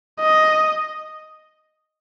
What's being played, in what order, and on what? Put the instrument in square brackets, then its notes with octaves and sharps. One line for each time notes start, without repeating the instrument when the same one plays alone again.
[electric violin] D#5